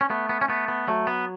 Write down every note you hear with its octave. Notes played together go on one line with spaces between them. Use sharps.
C#4
A3 B3
B3
C#4
A3 B3
B3
F#3 A3
B3